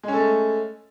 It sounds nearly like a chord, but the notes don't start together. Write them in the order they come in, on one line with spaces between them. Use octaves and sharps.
G#3 C#4 A4 A3